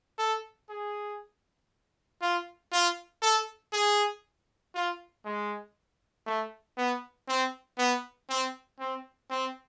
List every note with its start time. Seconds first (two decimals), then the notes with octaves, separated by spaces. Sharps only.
0.19 A4
0.70 G#4
2.22 F4
2.72 F4
3.22 A4
3.73 G#4
4.75 F4
5.25 G#3
6.26 A3
6.78 B3
7.28 C4
7.78 B3
8.29 C4
8.79 C4
9.30 C4